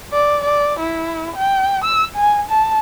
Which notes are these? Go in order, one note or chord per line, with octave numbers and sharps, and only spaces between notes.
D5
D5
E4
G5
E6
G#5
A5